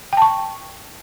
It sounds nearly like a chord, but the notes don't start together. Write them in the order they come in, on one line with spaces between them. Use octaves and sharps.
G5 A5 C#6